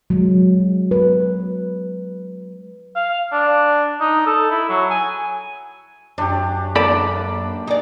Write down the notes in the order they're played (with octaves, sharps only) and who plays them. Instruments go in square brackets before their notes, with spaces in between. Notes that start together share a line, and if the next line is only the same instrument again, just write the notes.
[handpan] F#3 G#3
B4
[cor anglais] F5
D4
D#4
A4
E4
F#3
G#5
[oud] F#2 [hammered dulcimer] D4 G4
[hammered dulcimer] A#3 D4 [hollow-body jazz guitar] A4 D5 B5
[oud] D#4 D5 [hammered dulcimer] G#4